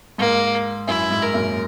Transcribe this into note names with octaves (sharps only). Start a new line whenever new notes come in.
G#2 A#3
F#2 E4
G#2
A#4
F#2 A#2